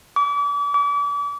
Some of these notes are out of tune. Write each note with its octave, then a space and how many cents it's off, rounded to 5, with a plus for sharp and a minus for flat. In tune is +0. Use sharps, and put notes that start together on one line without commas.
D6 -40
D6 -40